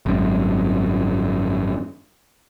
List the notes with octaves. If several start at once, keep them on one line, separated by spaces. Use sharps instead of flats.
G#1 F#2